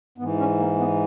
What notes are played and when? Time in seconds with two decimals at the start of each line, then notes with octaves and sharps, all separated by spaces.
0.18 G#2 E3 B3
0.38 C#4
0.58 A#3
0.79 B3